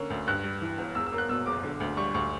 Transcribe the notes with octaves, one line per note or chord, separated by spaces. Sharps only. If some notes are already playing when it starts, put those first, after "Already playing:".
Already playing: D3 A#3 C#4
D2
G2 F#6
G3
E3
G1
E2 E6
E6
A#3
F#6
B2 E6
F#1 D6
D3
D2
G3 C#6
D2 C#6